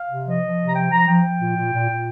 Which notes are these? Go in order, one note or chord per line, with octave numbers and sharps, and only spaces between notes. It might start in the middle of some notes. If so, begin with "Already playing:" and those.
Already playing: F5
C3
F3 D#5
F3
C3
A#5
F3 G5
F3 A#5
F3 G5
F3
A#2
A#2
A#2
A#2